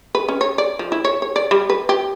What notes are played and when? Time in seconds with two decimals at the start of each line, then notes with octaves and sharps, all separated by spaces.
0.15 B4
0.28 C#4
0.41 C#5
0.58 D5
0.79 F3
0.92 E4
1.05 C#5
1.22 C#5
1.36 D5
1.51 G3
1.70 B4
1.89 G4